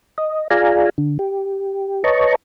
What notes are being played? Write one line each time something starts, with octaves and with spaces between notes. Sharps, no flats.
D#5
F4 G#4 D5 F5 G#5 A#5
D3
G4
B4 C#5 D#5 A5 A#5 C#6